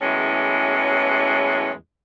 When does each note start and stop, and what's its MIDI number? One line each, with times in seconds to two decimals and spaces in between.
0.01 1.71 40
0.01 1.71 45
0.01 1.71 52
0.01 1.71 54
0.01 1.71 56
0.01 1.71 61